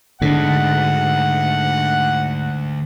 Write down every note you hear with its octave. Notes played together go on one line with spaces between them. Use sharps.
D2 G#2 D3 A4 F#5